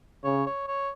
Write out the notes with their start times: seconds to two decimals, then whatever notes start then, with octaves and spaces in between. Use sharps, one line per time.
0.24 C#3 C#5
0.47 C#5
0.68 C#5